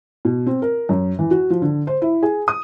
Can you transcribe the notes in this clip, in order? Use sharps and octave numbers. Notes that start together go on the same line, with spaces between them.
B2
C4
A#4
F#2
E3
F#4
F3
D3
C5
E4
G#4
D#6